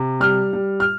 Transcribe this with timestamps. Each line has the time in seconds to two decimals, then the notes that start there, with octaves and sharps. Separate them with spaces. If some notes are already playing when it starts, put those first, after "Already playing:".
Already playing: C3
0.20 G3 F6
0.53 G3
0.80 F6